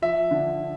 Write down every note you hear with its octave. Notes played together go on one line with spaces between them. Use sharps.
F3 E5
D3